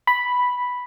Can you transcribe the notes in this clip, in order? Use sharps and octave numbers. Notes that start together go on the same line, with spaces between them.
B5